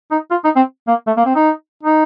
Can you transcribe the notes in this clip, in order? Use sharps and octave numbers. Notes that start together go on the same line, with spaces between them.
D#4
F4
D#4
C4
A#3
A3
A#3
C4
D#4
D#4